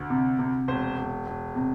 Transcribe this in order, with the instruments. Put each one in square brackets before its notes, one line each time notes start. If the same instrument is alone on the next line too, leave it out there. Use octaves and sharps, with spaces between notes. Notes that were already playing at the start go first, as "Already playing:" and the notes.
Already playing: [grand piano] D2
C3
C3
E1 C5
E1
E1
C3